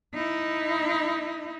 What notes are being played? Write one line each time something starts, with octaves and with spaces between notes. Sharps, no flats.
D#4 E4